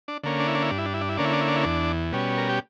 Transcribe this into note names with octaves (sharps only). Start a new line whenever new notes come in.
D4
D3 A#3 C#4
D4
E4
D4
E4
G2 D4
E4
D4
E4
D4
E4
D3 A#3 C#4 D4
E4
D4
E4
D4
E4
E2 D4
B2 G3 C#4
A#4
G4